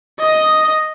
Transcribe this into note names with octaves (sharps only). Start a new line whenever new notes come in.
D#5